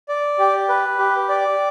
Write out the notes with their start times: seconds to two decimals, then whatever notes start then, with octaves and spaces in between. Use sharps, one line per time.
0.09 D5
0.39 G4
0.69 B4
0.99 G4
1.29 D5